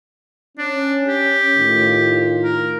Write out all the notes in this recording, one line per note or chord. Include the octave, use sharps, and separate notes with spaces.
C#4 D4
G4
A2 D#3 F4
A#4